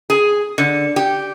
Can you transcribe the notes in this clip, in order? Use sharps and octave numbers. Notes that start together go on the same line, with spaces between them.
G#4
D3
G4